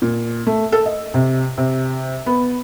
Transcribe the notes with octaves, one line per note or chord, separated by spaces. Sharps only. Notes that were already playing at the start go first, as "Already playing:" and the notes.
A#2
A3
A4
D#5
C3
C3
B3